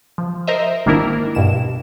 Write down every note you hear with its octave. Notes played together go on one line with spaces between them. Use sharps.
F3
A#4 C5 D#5 E5
G#1 D#3 A#3 D4 E4 A#4
G2 B2 E7